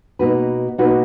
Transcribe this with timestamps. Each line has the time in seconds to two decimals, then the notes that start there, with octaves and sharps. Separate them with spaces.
0.19 B2 A#3 D#4 F#4 B4
0.78 B2 A#3 D#4 F#4 B4